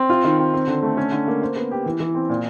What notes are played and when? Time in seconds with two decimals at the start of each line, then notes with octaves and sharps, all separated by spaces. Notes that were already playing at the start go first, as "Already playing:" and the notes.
Already playing: C4
0.10 F4
0.24 D#3
0.38 C4
0.54 C4
0.67 D3
0.82 A3
0.97 C#4
1.12 D3
1.27 A#3
1.42 C5
1.56 B3
1.71 G4
1.86 E3
2.00 E3
2.15 C4
2.29 A#2